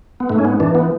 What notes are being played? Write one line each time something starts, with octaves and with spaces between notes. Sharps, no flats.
B3
G#2 A3
C#4
B3
E3 D4
B3